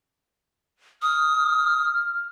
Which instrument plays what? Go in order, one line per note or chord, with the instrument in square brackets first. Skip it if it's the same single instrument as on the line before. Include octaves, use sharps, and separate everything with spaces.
[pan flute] D#6 [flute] F6